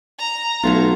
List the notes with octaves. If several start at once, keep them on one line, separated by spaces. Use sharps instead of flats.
A#5
B1 F#3 A3 F4